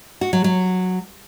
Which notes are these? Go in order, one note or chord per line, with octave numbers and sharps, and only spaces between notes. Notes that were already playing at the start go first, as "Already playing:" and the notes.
F#4
F#3
F#3